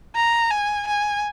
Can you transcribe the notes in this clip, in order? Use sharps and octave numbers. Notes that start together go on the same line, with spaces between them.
A#5
G#5
G#5